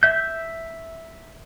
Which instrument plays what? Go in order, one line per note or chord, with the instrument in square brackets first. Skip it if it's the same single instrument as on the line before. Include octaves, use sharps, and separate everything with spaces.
[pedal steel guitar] E5 G6